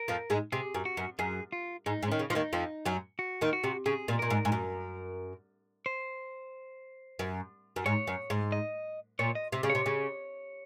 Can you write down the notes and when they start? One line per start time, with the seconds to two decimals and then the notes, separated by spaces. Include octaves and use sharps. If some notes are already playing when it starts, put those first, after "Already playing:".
Already playing: A#4
0.08 F2 F3
0.30 G#2 G#3
0.52 C3 G#4
0.75 F#2
0.85 F#4
0.97 F#2
1.19 F#2 G#4
1.52 F4
1.86 G#2 D#4
2.03 G#2
2.08 D#3 C#4
2.19 C#3
2.30 F3 D#4
2.35 D#2 D#3
2.53 F2 F3
2.85 F#2 F#3
3.19 F#4
3.41 D#2 D#3
3.53 F#4
3.64 C3
3.86 C#3 G#4
4.08 A#2
4.19 A#2 A#4
4.30 G#2
4.45 G#2
4.52 F#2
5.86 C5
7.19 F#2
7.76 F#2
7.86 G#2 C#5
8.07 F#2
8.30 G#2
8.52 D#5
9.19 A#2 C#5
9.35 D#5
9.52 C3
9.63 C#3
9.70 C#5
9.75 C3
9.86 C#3